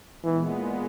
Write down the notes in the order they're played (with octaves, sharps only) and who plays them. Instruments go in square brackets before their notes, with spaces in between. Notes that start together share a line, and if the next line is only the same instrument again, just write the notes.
[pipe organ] A#2 G#3 B3 [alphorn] E3